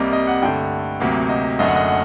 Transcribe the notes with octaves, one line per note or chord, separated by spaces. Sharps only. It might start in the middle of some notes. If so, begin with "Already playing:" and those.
Already playing: C2 C3 G3 A#3 D#5
D#5
F#5
G2 D3 A3 G5
D2 C3 F#3 A#3
D#5
F#1 F#2 D3 A3 D#5
F#5
D#5
F#5